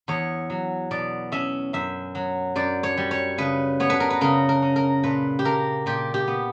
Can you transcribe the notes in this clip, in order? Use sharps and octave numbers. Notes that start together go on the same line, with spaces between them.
E2 C#5
F#3
B2 D5
C#4 E5
F#2 E5
F#3
F#2 D5
C#5
G3
C#5
C#3 B4
B3 C#5
B4
A#4
B4
C#3 A#4
A#4
C#4
A#4
A#2 B4
G4
A#3 A#4
A#2 G4
G4
B3